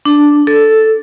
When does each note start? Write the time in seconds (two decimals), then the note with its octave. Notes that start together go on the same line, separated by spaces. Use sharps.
0.05 D4
0.47 A4